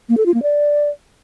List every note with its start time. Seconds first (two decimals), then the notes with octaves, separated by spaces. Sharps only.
0.09 A#3
0.17 A4
0.26 F4
0.34 A#3
0.43 D5